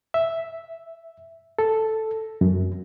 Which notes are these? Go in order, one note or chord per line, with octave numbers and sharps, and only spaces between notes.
E5
A4
F#2